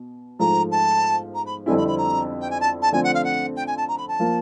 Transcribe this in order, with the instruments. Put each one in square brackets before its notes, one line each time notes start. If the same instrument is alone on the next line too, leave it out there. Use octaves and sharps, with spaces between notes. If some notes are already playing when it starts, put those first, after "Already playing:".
Already playing: [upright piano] B2
[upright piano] G#2 F3 A3 [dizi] A#5
[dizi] A5
A#5
B5
[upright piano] F2 D3 G3 C4 E4 [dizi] G#5
[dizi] B5
B5
A#5
G5
G#5
A5
A5
[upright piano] D3 F3 A3 C4 [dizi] G#5
[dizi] F#5
F5
F#5
G5
G#5
A5
A#5
B5
A5
[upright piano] F3 A#3